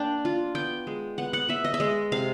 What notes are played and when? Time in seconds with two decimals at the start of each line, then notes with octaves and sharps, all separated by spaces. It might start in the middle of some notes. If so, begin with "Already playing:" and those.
Already playing: A#3 D4 G5
0.25 F4
0.55 B3 G5
0.87 G#3
1.18 B3 F#5
1.33 F#5
1.49 B3 E5
1.65 D#5
1.74 E5
1.80 G#3 D#5
2.12 C3 F5